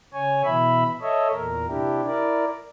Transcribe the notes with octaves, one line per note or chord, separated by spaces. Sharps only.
C#3 C#5 G#5
B2 E3 E5 B5
A4 C#5 D#5 E5
E2 A#2 A#4
C3 D4 E4 G4
E4 A#4 D5